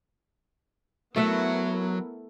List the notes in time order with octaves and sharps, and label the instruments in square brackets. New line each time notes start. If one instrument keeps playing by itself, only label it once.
[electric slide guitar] F#3 [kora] A3 E5 F#5 [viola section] B3 E4 A#4